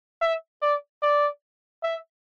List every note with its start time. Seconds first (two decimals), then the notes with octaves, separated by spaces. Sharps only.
0.21 E5
0.62 D5
1.03 D5
1.83 E5